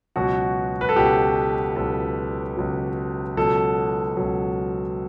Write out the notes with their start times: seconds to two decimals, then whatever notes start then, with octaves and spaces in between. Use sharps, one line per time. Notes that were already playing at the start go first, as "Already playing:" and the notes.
0.16 C#2 B2 F#3 F#4
0.81 B4
0.89 A4
0.96 C#2 B2 F#3 G4
1.76 C#2 B2 F#3 A4
2.56 C#2 B2 F#3
3.37 C#2 B2 F#3 A4
4.17 C#2 B2 F#3